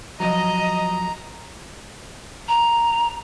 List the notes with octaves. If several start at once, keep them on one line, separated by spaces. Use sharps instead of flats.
F3 F#3 D#5 A#5
A#5